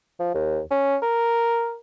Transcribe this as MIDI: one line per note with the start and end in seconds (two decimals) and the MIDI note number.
0.19 0.30 53
0.34 0.59 39
0.71 0.96 61
1.02 1.76 70